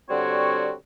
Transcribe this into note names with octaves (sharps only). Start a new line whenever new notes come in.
D3 G3 C4 F#4 C#5